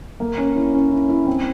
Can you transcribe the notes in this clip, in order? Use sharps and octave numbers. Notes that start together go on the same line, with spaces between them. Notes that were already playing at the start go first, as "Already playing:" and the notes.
A#3
C#4
E4
C#4
E4
E4
C4